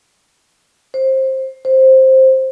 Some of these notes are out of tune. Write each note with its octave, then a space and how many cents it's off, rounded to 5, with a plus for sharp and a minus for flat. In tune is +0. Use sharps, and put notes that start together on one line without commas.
C5 +20
C5 +10